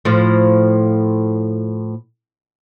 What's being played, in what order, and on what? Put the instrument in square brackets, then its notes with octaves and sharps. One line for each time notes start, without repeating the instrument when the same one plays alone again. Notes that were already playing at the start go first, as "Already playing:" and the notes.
[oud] A2 F3